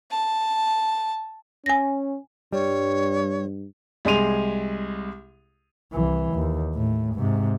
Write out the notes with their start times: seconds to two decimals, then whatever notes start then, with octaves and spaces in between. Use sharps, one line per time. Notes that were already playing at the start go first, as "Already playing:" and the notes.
0.11 A5
1.66 C#4 G#5 A#6
2.53 G2 G3 C#5
4.05 C2 G#3 G#4 C6 D#7 F7
5.92 C2 E3
6.34 D#2
6.75 A2
7.15 G#2 C3